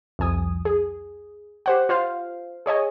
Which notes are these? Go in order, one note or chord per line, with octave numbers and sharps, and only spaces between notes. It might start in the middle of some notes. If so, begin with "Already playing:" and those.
C2 F2 G#5 D#6
G#4
G4 C5 F#5
F4 C5 F5
G#4 C#5 D#5 G#5